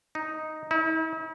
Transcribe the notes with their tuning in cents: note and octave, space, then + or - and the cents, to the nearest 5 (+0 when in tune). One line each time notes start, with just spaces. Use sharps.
D#4 +0
E4 -45